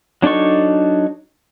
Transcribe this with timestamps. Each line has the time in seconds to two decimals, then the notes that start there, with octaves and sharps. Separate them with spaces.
0.22 F#3 D4 D#4 A4 C#6